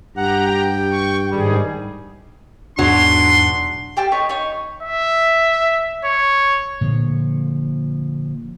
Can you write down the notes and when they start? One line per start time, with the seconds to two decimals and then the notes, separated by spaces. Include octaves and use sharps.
0.17 G2 G4 F#5 A#5
0.48 G5
0.91 C#6
1.31 G#2 D#3 G3 G#4
2.79 E2 G#2 B2 F#3 D4 C6
3.97 G4 G5 A5 F6
4.12 D#4 B4 C#5
4.29 D#4 C#5
4.83 E5
6.05 C#5
6.81 A#2 D3 F3